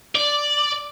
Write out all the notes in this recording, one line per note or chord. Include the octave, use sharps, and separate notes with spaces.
D5